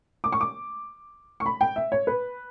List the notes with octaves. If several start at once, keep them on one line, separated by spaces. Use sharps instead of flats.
D6
C#6
D6
C#6
B5
G5
E5
C#5
B4